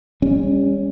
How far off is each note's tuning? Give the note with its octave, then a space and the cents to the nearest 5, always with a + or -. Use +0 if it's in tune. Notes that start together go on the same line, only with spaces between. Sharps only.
G3 +35 C#4 +0